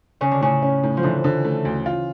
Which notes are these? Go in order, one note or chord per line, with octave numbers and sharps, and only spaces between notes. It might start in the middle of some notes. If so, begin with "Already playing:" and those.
C#3 C#4
D3
A2 C#3
C#4
A2
F3
D3 E3
D3
A3
D2
F4